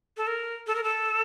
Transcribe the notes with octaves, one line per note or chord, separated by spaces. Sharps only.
A4
A#4
A4
A#4
A4